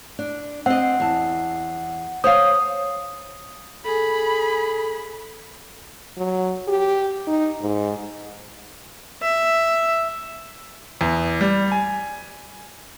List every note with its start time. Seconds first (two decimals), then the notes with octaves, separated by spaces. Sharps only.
0.19 D4
0.66 C4 D#5 F#5
1.00 E2 A5
2.24 C5 C#5 F5 D#6
3.85 G#4 A4 B5
6.18 F#3
6.68 G4
7.27 D#4
7.61 G#2
9.22 E5
11.01 E2
11.41 G3
11.72 G#5